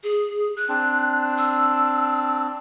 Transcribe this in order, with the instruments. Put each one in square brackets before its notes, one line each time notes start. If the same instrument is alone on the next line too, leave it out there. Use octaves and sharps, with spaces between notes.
[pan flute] G#4
F#6
[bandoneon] C4 D4
[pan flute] E6